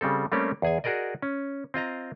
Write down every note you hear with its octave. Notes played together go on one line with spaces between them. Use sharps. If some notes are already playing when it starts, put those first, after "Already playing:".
C#3 G3 C4 A4
G3 A3 A#3 C4 C#4 G4
E2 G#4 G#5
F#4 G#4 A#4 D5 D#5
C#4
C4 F4 D#5 A#5